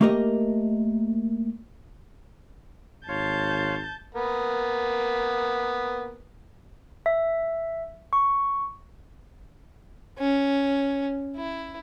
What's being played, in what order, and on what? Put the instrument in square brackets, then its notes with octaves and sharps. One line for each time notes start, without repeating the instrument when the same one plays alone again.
[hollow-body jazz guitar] A3 A#3 G4 A#4 D#5
[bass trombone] G#1 [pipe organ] C#5 F5 C6 [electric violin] A5 G6
[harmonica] A#3 B3
[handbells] E5
C#6
[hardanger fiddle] C#4
E4